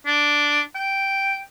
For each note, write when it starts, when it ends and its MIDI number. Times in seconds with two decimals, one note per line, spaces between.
0.06 0.61 62
0.75 1.40 79